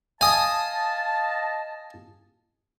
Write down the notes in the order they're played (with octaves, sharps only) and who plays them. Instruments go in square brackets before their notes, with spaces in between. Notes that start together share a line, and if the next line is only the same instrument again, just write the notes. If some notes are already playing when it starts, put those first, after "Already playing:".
[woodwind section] D#5 F5 A5 [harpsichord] G#5 D#6